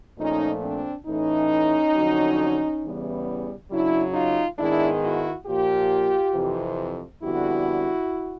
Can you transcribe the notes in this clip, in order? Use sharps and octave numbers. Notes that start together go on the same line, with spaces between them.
A#2 F3 A3 C#4 D#4
C4 D4
A2 E3 A3 C#4 D#4
F2 D3 F#3
E2 C#3 E3 G3 B3
F#2 C#3 F#3 D4 E4
D#4 F4
G#2 D#3 G#3 B3 D4 E4
E4 F#4
A#2 F3 A#3 F4 G4
F2 C3 E3
F2 D3 G3 B3 E4 F#4